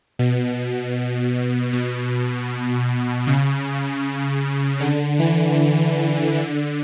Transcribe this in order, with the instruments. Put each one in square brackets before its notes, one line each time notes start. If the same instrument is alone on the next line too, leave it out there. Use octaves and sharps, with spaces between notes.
[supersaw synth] B2
B2
C#3
D3
E3
D3